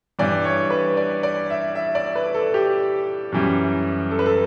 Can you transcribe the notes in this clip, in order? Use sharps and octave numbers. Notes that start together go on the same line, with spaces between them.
G2 E3 G3 D5
C#5
B4
D5
D5
E5
E5
D5
B4
A4
G4
F#2 E3 G3
A4
B4
A4